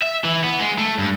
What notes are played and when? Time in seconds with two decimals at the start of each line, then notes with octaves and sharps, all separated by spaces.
0.03 E5
0.25 E3
0.44 B3
0.60 G#3
0.78 A3
0.99 G2